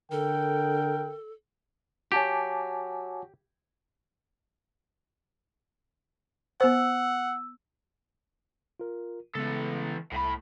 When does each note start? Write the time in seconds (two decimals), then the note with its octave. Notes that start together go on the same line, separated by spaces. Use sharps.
0.12 D3 A4 A#4 G5
2.12 F#4 G4 C#5 G#5 A5 D6
6.61 B3 C5 F#5 E6
8.80 F4 A#4
9.35 C#3 E3 G#3 B3 A4
10.12 C2 A2 B5